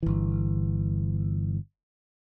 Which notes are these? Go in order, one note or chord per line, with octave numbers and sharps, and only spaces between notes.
G1 E3